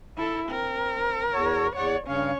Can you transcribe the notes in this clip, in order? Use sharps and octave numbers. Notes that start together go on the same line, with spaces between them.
E4 A4
C4 A#4
E2 F#4 C#5
E2 C#5 D5 F#5
G2 C#3 C#4 C#5 F5